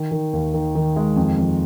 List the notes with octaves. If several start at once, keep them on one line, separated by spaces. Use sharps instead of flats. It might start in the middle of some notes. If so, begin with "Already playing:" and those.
Already playing: D#3
D#3
D#2
D#3
D#3
G#3
F2
F2